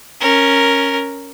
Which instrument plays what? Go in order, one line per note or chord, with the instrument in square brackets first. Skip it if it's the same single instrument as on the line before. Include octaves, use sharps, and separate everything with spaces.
[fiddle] C#4 A#4